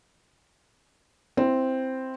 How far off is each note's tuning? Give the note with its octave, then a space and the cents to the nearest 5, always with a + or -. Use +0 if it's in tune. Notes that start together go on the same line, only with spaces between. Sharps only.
C4 +0 E4 +0